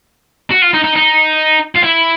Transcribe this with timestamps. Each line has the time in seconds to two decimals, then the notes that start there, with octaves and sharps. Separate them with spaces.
0.51 F#4
0.62 F4
0.74 D#4
0.84 D#4
0.96 D#4
1.76 F4
1.84 E4